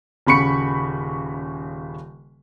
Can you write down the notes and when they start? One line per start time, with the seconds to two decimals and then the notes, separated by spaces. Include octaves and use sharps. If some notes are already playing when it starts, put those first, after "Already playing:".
0.27 D#1 C#3 B5 C#6 C#7